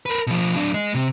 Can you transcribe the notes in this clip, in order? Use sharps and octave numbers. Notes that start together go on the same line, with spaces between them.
A#4 B4
B2 F3
F#3 D4
G#3 D#5
C3